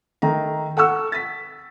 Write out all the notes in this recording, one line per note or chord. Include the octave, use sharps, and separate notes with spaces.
D#3 A3 A#5
A4 F#5 C#6 E6
A6 B6